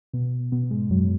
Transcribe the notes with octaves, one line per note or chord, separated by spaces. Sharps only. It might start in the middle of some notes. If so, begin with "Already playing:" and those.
B2 B3
B2 B3
G#2 G#3
F#2 F#3